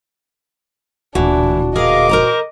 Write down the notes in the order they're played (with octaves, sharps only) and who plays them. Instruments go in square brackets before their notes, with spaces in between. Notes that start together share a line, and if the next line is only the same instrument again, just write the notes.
[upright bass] D1 D2 [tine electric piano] A#2 F#4 [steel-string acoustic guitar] E3 [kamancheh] D4
[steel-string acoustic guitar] G#4 A#4 F5 [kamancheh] D#5 D6
[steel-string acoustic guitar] A#4 C5 A#5